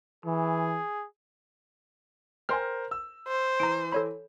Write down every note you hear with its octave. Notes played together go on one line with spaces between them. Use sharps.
E3 G#4
A#4 C5 G5 G#5 C6 F6
E6
C5
E3 A#5 D7
A4 C#5 B5